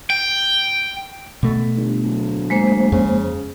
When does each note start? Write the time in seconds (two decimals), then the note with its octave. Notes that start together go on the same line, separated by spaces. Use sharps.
0.10 G5
1.43 B2 A3
1.77 G1
2.04 D1
2.50 G#3 A#3 C5
2.92 F2 C#3